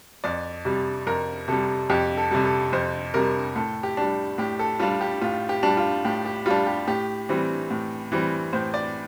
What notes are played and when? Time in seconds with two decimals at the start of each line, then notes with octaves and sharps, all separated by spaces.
0.24 F2 D5
0.65 C3 G3
1.07 F2 A#4
1.48 C3 G3 A4
1.90 F2 G4
2.17 A4
2.31 C3 G3
2.45 A4
2.73 F2 C5
3.14 C3 G3 A#4
3.56 A2 A4
3.83 G4
3.97 G3 D4
4.38 A2 G4
4.59 A4
4.80 G3 D4 F4
5.01 G4
5.21 A2 F4
5.49 G4
5.63 G3 D4
5.77 F4
6.05 A2 G4
6.25 G4
6.46 G3 D4 F4
6.67 G4
6.88 A2 G4
7.29 E3 G3 C4
7.71 A2
8.12 E3 G3 C4
8.53 A2 C5
8.74 D5